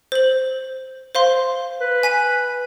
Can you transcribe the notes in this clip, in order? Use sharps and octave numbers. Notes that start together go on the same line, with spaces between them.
C5 F#7
C5 F5 C6
B4
G#5 B6 D#7